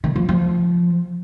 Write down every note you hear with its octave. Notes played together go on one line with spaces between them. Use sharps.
D#3
F3
F3